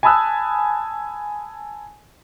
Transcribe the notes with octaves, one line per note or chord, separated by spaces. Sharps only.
G#5 A5 B5 D#6 E6 F#6